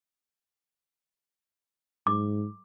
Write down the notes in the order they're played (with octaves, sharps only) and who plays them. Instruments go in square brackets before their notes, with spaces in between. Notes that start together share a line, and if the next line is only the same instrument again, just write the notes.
[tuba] G#2 [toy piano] D6